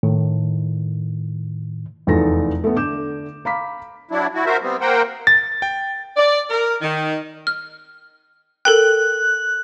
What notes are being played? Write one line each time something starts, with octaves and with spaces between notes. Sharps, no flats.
A2 D#3
F1 E2 F3 D#4 A4 A#6
A3 B3
D3 D6 G6 E7
F5 A#5 B5 D6 B6
F#3 D4 E4
E4 F#4
F#4 A#4 C5 E5
G3 B3 C4
A#3 A#4 C5 F#5 G5
A6
G5
D5
A#4
D#3
F6
A4 A#4 G5 F#6